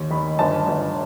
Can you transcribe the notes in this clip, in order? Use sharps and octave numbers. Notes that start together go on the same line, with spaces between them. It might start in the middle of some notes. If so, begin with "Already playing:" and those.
Already playing: D#2
D#3 B5
G1 A5
G1